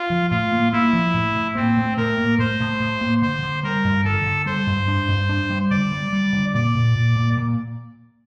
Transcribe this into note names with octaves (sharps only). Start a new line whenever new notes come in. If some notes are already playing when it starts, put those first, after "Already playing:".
Already playing: F4
F3
A2 F4
A#3
A#3 E4
F3
A2
A2
A#3 C4
A2
A2 A#4
A#3
A2 C5
A2
A2
A#3
D3 C5
D3
G3 A#4
G2
D3 A4
D3
G3 C5
G2
D4
G2
D4
G3
D3 D5
G3
G3
D3
A#2 D5
A#2
A#2
A#2
A#2